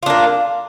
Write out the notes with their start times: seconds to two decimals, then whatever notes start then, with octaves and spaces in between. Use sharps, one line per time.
0.03 F4
0.06 D4
0.10 A#3